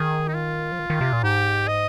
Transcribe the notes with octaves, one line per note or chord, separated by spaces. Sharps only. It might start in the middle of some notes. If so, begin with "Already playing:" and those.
Already playing: D#3 G#4
D#4
F4
F3
D#3
D#3
C3
A#2
G#2 G4
D#5